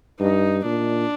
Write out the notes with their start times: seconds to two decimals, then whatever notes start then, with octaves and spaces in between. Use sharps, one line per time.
0.19 G2 D#4
0.64 A#2 D4